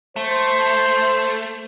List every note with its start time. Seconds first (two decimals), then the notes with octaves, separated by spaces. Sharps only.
0.16 A3 C5